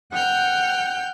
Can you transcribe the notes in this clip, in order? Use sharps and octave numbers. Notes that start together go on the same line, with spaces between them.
F#5 G5 F6 G6